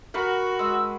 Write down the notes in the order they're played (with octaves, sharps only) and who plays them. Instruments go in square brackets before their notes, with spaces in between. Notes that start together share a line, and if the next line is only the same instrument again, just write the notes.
[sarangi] F#4 [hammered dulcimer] A#4 B5 C#6
[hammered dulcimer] G#3 [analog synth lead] E6